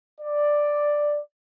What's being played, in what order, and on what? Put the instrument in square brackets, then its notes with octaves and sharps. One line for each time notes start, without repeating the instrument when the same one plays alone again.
[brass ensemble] D5